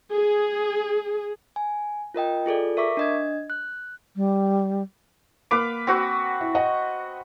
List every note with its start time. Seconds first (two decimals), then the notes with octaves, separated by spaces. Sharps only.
0.11 G#4
1.56 G#5
2.14 F4 A#4 D#5 G5
2.46 F4 G#4 A4 D5
2.77 A#4 E5 C#6 D6 B6
2.97 D4 D#5 G#6
3.50 F#6
4.16 G3
5.51 A#3 B4 F5 D6
5.87 C4 F#4 B4
6.41 E4
6.55 D#5 F#5